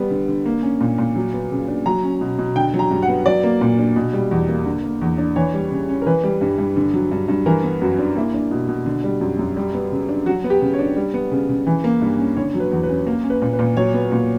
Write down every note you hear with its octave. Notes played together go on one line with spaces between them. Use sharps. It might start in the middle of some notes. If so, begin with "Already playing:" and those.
Already playing: G3 B3
D3
D3
A#3
C#4
A#2
A#2
F#3
B3
C#3
D4
F#3 A#5
C#4
B2
B2
D3 G5
F#3
A#5
G2
F#5
B3
F#3 D5
A#3
A#2
D4
B2
G3
E2
A#3
D3
A#3
E2
D4
E3 C#5
G3
C#3
C#4
A#4
E3 B4
G3
G2
G2
D3
F#3
G2
G2
E3 A#4
B3
F#2 F#4
D4
A#3 E4
D4
B2
B2
D3
G3
F#2
F#2
G3
B3
C#3
D4
F#3 F#4
B3
G4
C#3
C#5
D4
G3
B3
C#3
C#3
E3
A#3
G2
C#4
D3 C#5
F#3
B4
E2
B4
C#4
A#3 A#4
C#4
B4
A#2
B4
A#2
F#3 C#5
B3
A#2